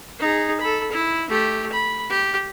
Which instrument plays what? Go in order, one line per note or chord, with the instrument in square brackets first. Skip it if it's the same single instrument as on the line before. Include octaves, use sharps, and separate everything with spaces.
[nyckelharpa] D#4 G#4
A4 B5
E4
A3 G4
B5
G4